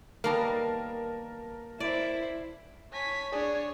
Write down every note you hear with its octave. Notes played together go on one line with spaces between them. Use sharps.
D#3 G3 A#3 B3 A#4 A5
E4 C5 D5
C#5 G#5 A5 B6
D4 G#4 C#5 D5